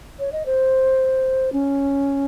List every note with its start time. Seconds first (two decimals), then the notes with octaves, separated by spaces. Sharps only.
0.19 C#5
0.32 D#5
0.46 C5
1.53 C#4